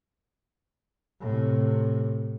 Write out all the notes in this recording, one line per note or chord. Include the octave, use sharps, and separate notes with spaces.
A2 C3